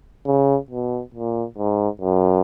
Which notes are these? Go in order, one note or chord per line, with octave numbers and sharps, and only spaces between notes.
C#3
B2
A#2
G#2
F#2